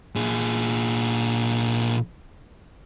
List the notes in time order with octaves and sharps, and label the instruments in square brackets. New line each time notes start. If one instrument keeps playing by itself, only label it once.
[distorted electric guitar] A#2 G#4